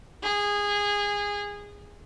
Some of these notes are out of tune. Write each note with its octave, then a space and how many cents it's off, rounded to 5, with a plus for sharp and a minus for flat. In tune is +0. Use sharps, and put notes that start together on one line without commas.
G#4 -20